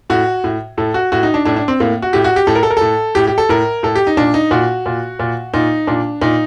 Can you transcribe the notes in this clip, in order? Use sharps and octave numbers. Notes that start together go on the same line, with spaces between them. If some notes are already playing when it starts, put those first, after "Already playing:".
A2 F#4
A2
A2 A4
F#4
A2 F#4
D#4
D4
A2 D4
D4
C4
A2 A#3
F#4
A2 G4
F#4
G4
A2 A4
A#4
A4
A#4
A2 A4
A2 G4
G4
A4
A2 A#4
A2 A4
G4
D#4
A#2 D4
D#4
A#2 F#4
A#2
A#2
A#2 D#4
A#2 D4
A#2 D#4